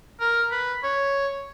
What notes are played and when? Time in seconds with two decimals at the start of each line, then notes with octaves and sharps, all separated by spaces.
0.20 A#4
0.51 B4
0.83 C#5